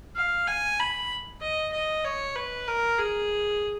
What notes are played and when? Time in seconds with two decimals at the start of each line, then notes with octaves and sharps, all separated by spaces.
0.17 F5
0.47 G#5
0.80 B5
1.42 D#5
1.73 D#5
2.05 C#5
2.36 B4
2.68 A#4
2.99 G#4